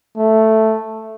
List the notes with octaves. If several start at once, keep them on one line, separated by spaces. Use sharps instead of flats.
A3